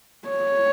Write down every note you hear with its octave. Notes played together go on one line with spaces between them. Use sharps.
C#5